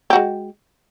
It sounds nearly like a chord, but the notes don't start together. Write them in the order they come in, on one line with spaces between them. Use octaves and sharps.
G4 F#4 G#3